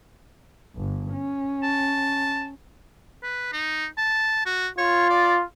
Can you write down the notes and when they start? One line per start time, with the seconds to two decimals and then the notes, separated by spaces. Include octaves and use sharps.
0.76 G1
1.13 C#4
1.63 A5
3.23 B4
3.53 D#4
3.98 A5
4.46 F#4
4.78 F4 C#5
5.10 D5